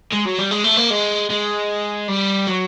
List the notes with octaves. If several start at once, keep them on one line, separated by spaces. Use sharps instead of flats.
G#3
F#3
G3
G#3
A3
A#3
G#3
G#3
G3
F#3